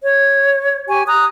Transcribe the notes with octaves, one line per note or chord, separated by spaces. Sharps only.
C#5
G4 G#5 C#6
A#5 D#6 F#6